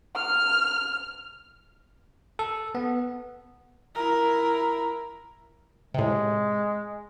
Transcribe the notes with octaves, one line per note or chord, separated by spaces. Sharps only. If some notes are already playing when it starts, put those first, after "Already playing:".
F6
A4
B3
E4 A#4
A2 C3 G#3